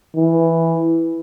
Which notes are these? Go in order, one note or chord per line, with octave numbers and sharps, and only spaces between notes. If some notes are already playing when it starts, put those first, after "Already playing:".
E3